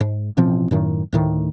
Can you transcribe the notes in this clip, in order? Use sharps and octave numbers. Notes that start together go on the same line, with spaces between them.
G#2
A1 B2 F3 C4
F#2 A2 D#3
D2 A2 D#3